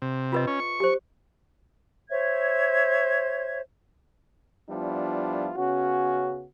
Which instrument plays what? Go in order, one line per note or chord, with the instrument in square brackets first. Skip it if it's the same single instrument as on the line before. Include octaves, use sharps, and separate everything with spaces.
[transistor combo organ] C3
[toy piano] F4 B4 D#5
[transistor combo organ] C#4
C#6
[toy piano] G4 C5
[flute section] C5 C#5 E5 G#6
[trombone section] F3 G3 B3 D4 E4 F4
C#3 B3 C#4 F#4